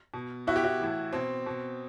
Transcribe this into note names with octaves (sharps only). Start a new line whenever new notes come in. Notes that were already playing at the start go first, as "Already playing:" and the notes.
B2
B2 E4 F#4
G4
E4 F#4
A2 E3
B2 C4
B2